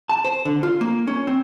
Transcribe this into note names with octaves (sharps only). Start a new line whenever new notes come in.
A5
C5
D3
F4
A#3
C#4
C4